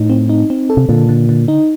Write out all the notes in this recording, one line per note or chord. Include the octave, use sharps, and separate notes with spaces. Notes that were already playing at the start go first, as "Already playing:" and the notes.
Already playing: A2 D#4
C4
D#4
C4
A4
C3
A#2 D3
D3
D3
D#4